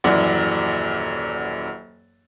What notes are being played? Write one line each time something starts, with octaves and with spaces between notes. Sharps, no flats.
D#1 F#2 E3 D5 F#5